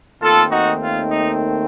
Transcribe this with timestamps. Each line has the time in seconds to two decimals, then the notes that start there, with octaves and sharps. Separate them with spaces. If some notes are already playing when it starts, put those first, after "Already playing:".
0.21 D#2 D#3 A3 C4 F4 A4
0.51 D#4 F#4
0.81 F4
1.11 D#4